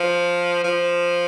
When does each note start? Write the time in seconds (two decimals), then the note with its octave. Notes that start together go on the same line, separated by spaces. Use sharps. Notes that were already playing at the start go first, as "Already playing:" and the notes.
Already playing: F3
0.64 F3